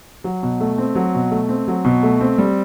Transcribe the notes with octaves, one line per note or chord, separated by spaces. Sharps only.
F#3
B2
A3
C4
F#3
B2
A3
C4
F#3
B2
A3
C4
G3